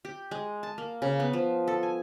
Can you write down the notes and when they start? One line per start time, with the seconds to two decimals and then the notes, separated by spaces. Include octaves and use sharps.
0.05 G4
0.31 G#3
0.63 A5
0.78 A#3
1.02 C#3
1.20 B3
1.33 F3
1.67 A4
1.83 G#5